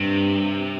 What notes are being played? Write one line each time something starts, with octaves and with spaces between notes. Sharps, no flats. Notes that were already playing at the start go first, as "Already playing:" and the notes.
Already playing: G2 C3